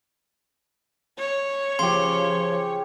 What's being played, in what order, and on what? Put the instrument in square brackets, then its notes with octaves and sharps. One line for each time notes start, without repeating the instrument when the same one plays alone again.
[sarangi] C#5
[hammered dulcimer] C#3 G4 [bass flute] F3 [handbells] C6